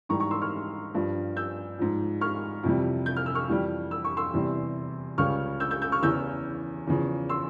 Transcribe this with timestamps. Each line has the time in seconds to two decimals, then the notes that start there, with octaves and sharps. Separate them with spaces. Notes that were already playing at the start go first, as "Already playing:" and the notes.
0.09 G#2 E3 G3 A#5 C#6
0.20 A#5 C#6
0.31 C6 E6
0.42 C#6 F6
0.95 G2 F3
1.37 E6 G6
1.79 G#2 F3
2.21 C#6 F6
2.63 F2 C3 E3 G3
3.06 G6
3.17 F6
3.26 E6
3.35 C#6 F6
3.49 F2 E3 G3
3.91 E6
4.04 C#6
4.17 C6 E6
4.33 E2 C3 E3 G3
5.18 C#2 C#3 G3 C#6 F6
5.60 E6 G6
5.71 E6 G6
5.82 E6 G6
5.92 C#6 F6
6.03 E2 C#3 E3 E6 G6
6.87 E2 C#3 F3
7.29 C6 E6